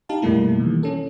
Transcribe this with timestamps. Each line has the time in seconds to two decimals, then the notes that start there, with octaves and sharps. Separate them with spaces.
0.09 D#4 G4 F5 A5
0.22 F#2 B2 G3 A3 A#3 E4
0.60 D#3 E3
0.83 C#4 A4